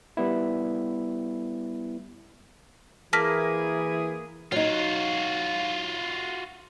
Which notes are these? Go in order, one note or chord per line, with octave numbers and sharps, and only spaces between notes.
G3 B3 E4
E3 A#3 E4 G#4 A5 F6 B6
F#3 D#4 F4 F#4